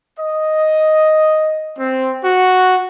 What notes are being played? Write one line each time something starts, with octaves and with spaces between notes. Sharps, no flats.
D#5
C4
F#4